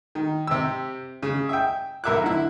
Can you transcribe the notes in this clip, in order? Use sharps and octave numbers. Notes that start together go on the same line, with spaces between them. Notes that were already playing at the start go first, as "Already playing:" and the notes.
D#3
C3 G4 E6
C#3
E5 G5
B1 A#4 E5 D6 F#6
D3 E4